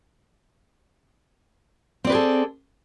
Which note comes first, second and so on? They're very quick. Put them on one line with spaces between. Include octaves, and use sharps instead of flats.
C4 D5 B4 G#4 A4